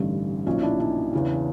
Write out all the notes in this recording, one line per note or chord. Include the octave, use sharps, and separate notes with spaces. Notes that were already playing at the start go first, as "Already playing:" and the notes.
Already playing: A1 G2 D3 G3 C#4 D#4
B1 A#2 F3 C#4 D#4
D4 E4
D4 E4
E2 C#3 E3